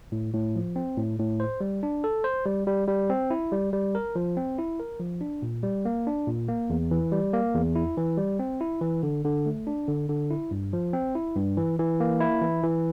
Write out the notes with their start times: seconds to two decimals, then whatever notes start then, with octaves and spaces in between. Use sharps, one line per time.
0.12 A2
0.34 A2
0.55 F3
0.76 C4
0.97 A2
1.19 A2
1.40 C5
1.61 G3
1.83 D4
2.04 A4
2.24 C5
2.46 G3
2.67 G3
2.88 G3
3.10 C4
3.31 E4
3.52 G3
3.73 G3
3.95 A#4
4.16 F3
4.37 C4
4.58 E4
4.80 A#4
5.00 F3
5.21 D4
5.42 A#2
5.63 G3
5.85 A#3
6.07 D4
6.27 A#2
6.48 A#3
6.70 E2
6.91 E3
7.12 G3
7.33 A#3
7.55 E2
7.75 E4
7.97 E3
8.18 G3
8.39 C4
8.61 E4
8.81 E3
9.03 D3
9.25 D3
9.46 A3
9.67 D4
9.88 D3
10.09 D3
10.31 E4
10.51 G2
10.73 F3
10.93 C4
11.15 E4
11.36 G2
11.57 E3
11.79 E3
12.00 A#3
12.20 E4
12.42 E3
12.64 E3